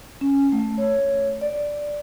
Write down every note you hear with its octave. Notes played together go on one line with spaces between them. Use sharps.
C#4
A3
C#5
D5